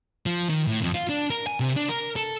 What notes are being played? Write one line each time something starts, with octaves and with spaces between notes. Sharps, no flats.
F3
D#3
A2
F2
F4
D4
A#4
G#5
C3
D4
A#4
A4